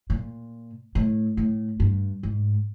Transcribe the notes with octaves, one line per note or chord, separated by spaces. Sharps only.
A#2
A2
A2
G2
G#2